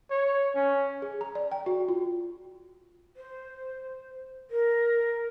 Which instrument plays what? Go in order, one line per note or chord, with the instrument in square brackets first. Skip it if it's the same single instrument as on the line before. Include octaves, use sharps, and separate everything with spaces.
[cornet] C#5
C#4
[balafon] G#4
A#5
D5
G5
F#4
F4
[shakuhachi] C5
A#4